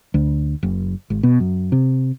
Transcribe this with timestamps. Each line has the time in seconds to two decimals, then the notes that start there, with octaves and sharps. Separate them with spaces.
0.14 D2
0.63 F#1
1.10 G#1
1.23 B2
1.40 F#2
1.72 C3